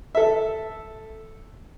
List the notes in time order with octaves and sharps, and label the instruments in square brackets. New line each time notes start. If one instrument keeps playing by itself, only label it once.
[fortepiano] A4 E5